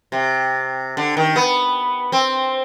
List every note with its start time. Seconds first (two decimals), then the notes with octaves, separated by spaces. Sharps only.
0.12 C3
0.97 D3
1.17 D#3
1.36 B3
2.12 C4